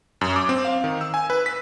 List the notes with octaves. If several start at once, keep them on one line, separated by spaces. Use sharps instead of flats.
F#2
D6
C4
F5
D#3
E6
G#5
B4
B6